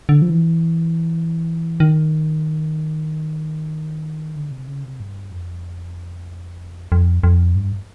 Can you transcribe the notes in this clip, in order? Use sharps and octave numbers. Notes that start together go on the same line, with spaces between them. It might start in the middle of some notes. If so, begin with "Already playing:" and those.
D3
F3
E3
D#3
D3
C3
C#3
C3
G2
F2
F2
F2
G2